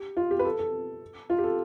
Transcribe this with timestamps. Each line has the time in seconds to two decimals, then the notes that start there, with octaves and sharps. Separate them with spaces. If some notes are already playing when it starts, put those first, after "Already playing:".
Already playing: G4
0.17 F4
0.31 G4
0.39 B4
0.45 A4
0.59 A4
1.30 F4
1.38 G4
1.44 A4